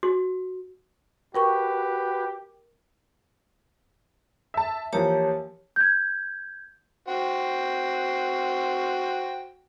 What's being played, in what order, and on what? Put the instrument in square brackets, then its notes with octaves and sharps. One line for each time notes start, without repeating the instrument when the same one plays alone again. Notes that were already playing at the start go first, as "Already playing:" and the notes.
[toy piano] F#4
[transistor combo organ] F#4 B4 [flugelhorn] G4 [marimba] A#4 G5 C#6
[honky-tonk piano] E5 A5
[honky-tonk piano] E3 F3 A#3 [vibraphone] G4 C#5 A5
[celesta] G6 G#6
[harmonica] F#4 C5 G5